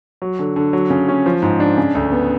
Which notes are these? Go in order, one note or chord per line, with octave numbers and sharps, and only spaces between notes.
F#3
D3
D3
F#3
C#3
C#4
F3
G#2
D4
C#3
D2
B3